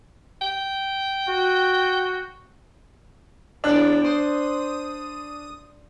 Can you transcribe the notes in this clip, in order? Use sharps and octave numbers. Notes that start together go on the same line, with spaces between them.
G5
F#4
E2 C3 D4 D5 F#6
C5 D#6